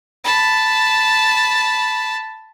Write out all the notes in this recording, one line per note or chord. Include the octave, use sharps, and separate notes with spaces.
A5 B5